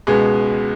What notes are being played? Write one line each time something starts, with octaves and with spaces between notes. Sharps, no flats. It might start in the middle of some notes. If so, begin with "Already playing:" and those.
C#2 B2 G#3 B3 G#4